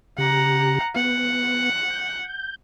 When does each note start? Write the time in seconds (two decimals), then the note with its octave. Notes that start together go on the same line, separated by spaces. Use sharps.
0.18 C#3 G4 F#5 A#5
0.96 B3 F#5
1.90 G6